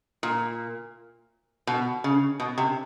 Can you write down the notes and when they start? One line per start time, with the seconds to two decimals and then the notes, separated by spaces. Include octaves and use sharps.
0.23 A#2
1.67 B2
2.04 C#3
2.40 B2
2.58 C3